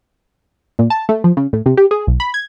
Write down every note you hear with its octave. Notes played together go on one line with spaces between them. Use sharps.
A#2
A5
A3
F3
C#3
A2
C3
G4
G#4
B1
B5
G#6